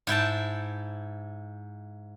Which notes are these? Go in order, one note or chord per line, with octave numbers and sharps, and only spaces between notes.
G#2 E4 G5 A5